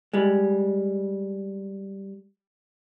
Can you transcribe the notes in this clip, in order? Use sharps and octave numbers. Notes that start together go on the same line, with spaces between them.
G3 G#3